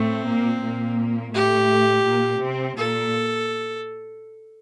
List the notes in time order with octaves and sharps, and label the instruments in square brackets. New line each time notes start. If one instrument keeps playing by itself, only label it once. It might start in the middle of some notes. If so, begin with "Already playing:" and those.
Already playing: [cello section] A2 A3 [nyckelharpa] C4
[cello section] A#2 A#3
A#2 A#3
[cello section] A2 A3 [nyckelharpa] G4
[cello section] A#2 A#3
C3 C4
[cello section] A#2 A#3 [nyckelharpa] A4